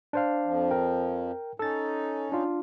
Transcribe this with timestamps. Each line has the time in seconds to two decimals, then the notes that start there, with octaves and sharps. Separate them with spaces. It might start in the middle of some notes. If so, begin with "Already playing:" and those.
0.13 D4 C5 F5
0.44 F2 F3
0.71 A#4 G5
1.59 C#4 D#4 A4 A6
2.32 D4 F4